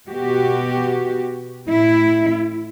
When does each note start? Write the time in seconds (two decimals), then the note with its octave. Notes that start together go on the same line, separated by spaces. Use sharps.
0.10 B2 F#4 G4
1.66 A2 E4